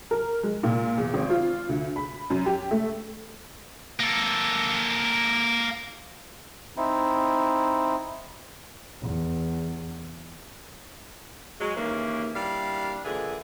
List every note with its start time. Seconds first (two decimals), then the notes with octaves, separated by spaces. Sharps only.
0.11 A#4
0.43 G#3
0.63 A#2
0.98 E2
1.14 G#1
1.30 F4
1.69 D2
1.96 B5
2.30 F#2
2.46 G4
2.71 A3
4.00 A#3 A4
6.77 C4 D#4 E4
9.01 E2
11.60 F#3 G#3
11.76 D#2 C#3 E3 A#3
12.36 G3 A#3 D4 E4 F5
13.05 A#2 D3 E3 G#4